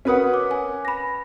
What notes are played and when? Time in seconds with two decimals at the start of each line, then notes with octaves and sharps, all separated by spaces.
0.05 C#4 F#4 A#4 B4 F#5 D#6
0.34 D6
0.51 G#5
0.85 B5 A#6